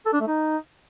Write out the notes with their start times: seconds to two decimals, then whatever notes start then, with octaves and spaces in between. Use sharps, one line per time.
0.06 A4
0.13 D4
0.20 A3
0.27 D#4